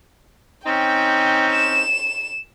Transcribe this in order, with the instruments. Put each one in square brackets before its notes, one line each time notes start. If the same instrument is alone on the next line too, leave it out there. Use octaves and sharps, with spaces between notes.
[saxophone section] C4 C#4 D#4 [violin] G5
[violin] E7